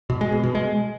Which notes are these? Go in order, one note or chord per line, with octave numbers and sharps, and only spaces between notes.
B2
G#3
B2
B2
G#3